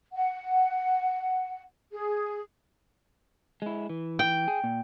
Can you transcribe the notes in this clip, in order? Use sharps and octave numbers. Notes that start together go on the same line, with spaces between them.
F#5
G#4
G#3 E4
E3
G5
G#4
A#2